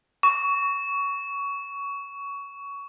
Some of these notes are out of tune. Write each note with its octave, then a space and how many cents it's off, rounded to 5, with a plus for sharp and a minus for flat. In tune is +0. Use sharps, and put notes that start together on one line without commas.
C#6 +20